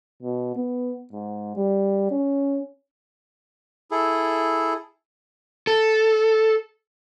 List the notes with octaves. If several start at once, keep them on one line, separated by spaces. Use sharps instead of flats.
B2
B3
G#2
G3
C#4
E4 G#4 A4
A4